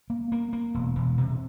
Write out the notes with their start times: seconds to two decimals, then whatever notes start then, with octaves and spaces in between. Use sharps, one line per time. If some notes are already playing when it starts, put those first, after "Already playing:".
0.10 A#3
0.32 A#3
0.53 A#3
0.74 E1
0.96 E1
1.18 C3